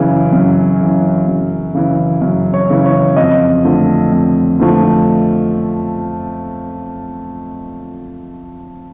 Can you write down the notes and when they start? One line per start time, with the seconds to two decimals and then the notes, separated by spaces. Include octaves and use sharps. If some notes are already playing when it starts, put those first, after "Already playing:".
Already playing: F#2 C#3 E3 G#5
0.33 F#2
0.81 C#3 E3
1.28 F#2
1.75 C#3 E3
2.22 F#2
2.54 C#5
2.70 C#3 E3
2.86 C#5
3.16 F2 D#5
3.65 D3 F3 A3
4.12 F2
4.60 D3 F3 A3